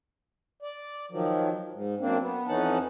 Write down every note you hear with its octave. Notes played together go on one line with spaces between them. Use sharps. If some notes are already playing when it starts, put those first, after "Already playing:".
D5
D#3 F3 F#3
G#2
F#2 A#3 C4 D4
B3
F2 E3 C#4 D#4 F#5 A5